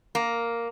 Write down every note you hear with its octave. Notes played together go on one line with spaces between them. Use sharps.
A#3